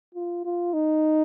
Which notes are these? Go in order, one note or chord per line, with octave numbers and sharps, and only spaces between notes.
F4
F4
D#4